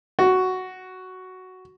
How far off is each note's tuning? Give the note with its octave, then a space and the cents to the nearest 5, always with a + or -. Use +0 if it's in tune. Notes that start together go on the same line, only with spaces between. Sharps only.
F#4 +5